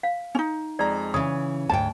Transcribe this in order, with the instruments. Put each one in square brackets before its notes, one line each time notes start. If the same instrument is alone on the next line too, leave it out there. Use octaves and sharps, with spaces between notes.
[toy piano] F5
[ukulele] C#4 D#4
[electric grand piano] F2 G#3 A#5 [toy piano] D5
[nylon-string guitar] C#3 E3 [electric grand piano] C#5 [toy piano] D#6
[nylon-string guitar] D2 G#2 G5 [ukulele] A5